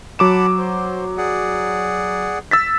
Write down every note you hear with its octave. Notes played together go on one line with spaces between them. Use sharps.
F#3 F#5 A5 B5 D6 E7
C5
G#4 D5 F#5
E6 A6 B6